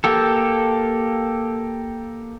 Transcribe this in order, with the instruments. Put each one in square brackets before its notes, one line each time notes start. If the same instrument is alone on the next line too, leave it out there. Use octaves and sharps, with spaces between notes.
[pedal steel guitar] A#3 G4 A4